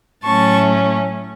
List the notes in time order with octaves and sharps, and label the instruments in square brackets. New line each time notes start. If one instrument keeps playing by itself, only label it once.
[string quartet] A2 F#3 A3 C#4 A5 C#6